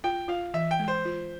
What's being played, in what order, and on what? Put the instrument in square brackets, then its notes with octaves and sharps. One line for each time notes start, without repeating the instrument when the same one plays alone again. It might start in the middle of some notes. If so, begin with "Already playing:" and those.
[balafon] F4 [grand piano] G5
[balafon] F4 [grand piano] F5
[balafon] E3 [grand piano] E5
[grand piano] G5
[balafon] G#3
[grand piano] C5
[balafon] F4